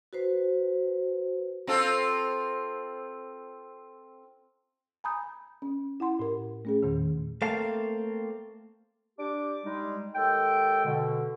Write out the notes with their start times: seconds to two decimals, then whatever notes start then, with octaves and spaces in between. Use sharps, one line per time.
0.13 F#4 B4 C5
1.67 C4 F4 A4
5.04 G#5 A#5 B5 D#6 G6
5.62 C#4
6.00 E4 F#5 C6
6.19 A2 A#4
6.65 A3 C#4 G#4
6.83 E2 A#2 D#3
7.42 A3 A#3 C4 F5 A5
9.19 D4 G4 D6
9.65 G3 G#3 D#4
10.14 D#2 G#3 A4 G5
10.85 B2 D3